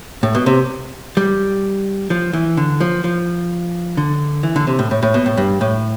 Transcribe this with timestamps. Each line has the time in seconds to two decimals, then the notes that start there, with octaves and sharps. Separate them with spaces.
0.23 A2
0.35 B2
0.46 C3
1.17 G3
2.10 F3
2.33 E3
2.57 D3
2.80 F3
3.04 F3
3.97 D3
4.43 E3
4.56 D3
4.67 C3
4.79 A2
4.91 A2
5.03 A2
5.14 B2
5.26 A2
5.37 G2
5.61 A2